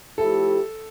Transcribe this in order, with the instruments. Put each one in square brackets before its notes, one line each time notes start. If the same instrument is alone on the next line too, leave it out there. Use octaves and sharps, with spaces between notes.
[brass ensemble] F3 A3 E4 G4 [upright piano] A4